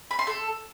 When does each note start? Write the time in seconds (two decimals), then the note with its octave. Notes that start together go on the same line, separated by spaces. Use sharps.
0.11 B5
0.19 C6
0.27 A4